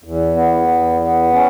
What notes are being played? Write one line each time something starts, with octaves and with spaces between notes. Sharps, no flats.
E2
B3
E2
B3
C#4